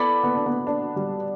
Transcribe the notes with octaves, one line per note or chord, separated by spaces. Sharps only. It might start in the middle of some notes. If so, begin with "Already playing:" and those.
Already playing: B3 E4 A4 D5 B5
B3
D4
B3
D4
G3